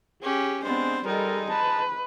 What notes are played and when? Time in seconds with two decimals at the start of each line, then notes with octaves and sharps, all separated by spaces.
0.22 C#4 G4 G#4
0.63 G#3 B3 C4 D4 C5
1.05 G3 G#3 D#4 A4 A#4
1.49 B4 A5